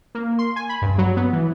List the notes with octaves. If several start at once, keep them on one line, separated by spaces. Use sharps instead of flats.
A#3
C6
G#5
B5
G2
F#3
B3
E3